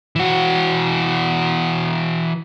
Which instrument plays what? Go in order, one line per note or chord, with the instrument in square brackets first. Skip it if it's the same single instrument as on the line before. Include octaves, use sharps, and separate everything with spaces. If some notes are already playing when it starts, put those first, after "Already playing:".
[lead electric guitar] E3 F#4